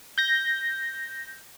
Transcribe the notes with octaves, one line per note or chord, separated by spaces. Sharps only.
G6 A#6